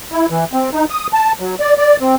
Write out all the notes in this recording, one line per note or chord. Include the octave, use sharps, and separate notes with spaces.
E4
E3
C4
D#4
D#6
A5
F#3
D5
D5
C4